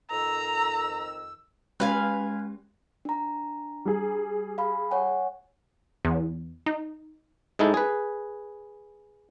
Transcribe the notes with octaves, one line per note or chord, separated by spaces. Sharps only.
F2 D#3 A#5 E6
G#3 C#4 G4 B4 F5 G#5
D4 A#5
G3 G#4
F5 B5
C#5 F#5 G#5
E2
D#4
G#2 G#3 D#4 E4 A4
G#4 B4